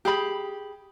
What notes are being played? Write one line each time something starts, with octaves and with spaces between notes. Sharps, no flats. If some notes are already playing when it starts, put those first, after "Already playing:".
G4 G#4 B5